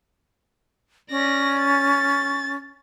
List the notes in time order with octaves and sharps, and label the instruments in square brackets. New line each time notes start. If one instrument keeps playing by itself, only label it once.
[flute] C#4 [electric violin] D5 A#6
[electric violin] A6